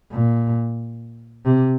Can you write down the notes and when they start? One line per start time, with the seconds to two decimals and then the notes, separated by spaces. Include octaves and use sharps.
0.12 A#2
1.45 C3